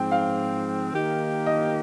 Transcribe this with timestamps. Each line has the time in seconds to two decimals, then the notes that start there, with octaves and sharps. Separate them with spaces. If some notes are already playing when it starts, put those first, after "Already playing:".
Already playing: G#2 F3 C4 G5
0.12 F5
0.92 D#3 A#3 D#4 G4
1.46 D#5